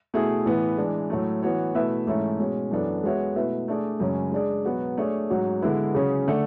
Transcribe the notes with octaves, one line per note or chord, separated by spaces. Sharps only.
B2 A3 E4 G#4
A2 E3 B3
E3 G#3 D4
A2 F#3 A3
E3 B3 F#4 C#5
B2 A3 E4 B4 E5
G#2 E3 A3 C#4 E4
B2 G#3 C#4
F#2 E3 B3 D4 A4
G#3 B3 F#4 C#5 E5
B2 A3 E4 B4 E5
A3 D4 G#4 D5
F#2 C#3 G#3 C#4
G#3 D4 G#4 D5
B2 F#3 B3 F#4 B4
A3 D4 G#4 C#5
G#2 F#3 C#4 F#4
D3 G#3 B3 E4 B4
C#3 F#3 C#4 G#4
D3 A3 D4 A4